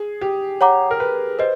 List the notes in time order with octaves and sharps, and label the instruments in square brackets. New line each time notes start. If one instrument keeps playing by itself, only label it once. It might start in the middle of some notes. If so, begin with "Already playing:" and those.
Already playing: [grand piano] G#4
G4
[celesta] C#5 F#5 A#5 D6
[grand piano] A#4
B4
[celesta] B4 D#5 [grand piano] C5